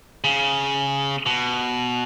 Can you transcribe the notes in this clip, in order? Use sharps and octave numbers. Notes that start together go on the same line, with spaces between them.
C#3
B2